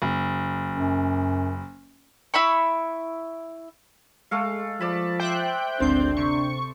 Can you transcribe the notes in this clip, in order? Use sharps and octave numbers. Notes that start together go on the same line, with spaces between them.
F#1
F#2
E4 E5 B5 C#6
G#3 A3 A4 F5
F3 D5 A5 B5
C5 E5 G5 F#6
G#1 D2 C4 D4 C5 G6
C3 C#6